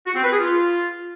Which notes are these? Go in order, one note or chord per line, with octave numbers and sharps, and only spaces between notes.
F#4
C4
B4
G#4
F4